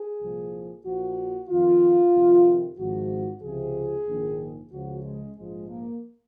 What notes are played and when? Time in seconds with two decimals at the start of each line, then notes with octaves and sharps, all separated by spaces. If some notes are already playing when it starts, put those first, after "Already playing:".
Already playing: G#4
0.21 C2 A#2 F3
0.86 A#1 A#2 F3 F#4
1.50 F2 D#3 F4
2.14 F2 C3 D#3
2.79 G#1 G#2 F3 F#4
3.43 C#2 C3 F3 G#4
4.07 A#1 G#2 D#3
4.72 C#2 C#3 F3 F#4
5.04 G#3
5.37 A#1 G#2 F3 G#3
5.69 A#3